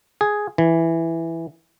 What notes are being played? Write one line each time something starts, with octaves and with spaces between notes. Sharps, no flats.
G#4
E3